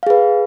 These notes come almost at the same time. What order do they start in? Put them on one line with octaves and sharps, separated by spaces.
F5 G#4 B4